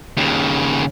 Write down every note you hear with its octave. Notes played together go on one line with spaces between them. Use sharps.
D#2 C#3